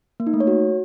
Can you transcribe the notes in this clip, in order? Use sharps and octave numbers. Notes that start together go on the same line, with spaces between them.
A#3
D#4
A3
C#5
F#4